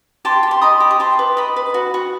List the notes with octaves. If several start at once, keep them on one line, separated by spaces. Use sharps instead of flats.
G4 A5 C6
G4
C6
D#5 B5 D#6
G4
D#6
G4 A5 C6
B4
D#5 B5 D#6
B4
F#4
F#4